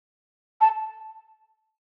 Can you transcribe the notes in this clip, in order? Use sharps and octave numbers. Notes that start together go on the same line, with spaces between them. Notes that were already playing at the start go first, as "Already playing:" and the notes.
A5